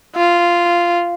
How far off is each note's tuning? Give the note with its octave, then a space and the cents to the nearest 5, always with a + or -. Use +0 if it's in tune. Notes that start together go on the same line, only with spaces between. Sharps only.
F4 -10